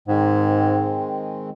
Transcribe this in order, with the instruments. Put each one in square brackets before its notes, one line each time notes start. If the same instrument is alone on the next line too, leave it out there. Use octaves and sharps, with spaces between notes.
[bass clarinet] G#2 [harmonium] D#3 G#3 C4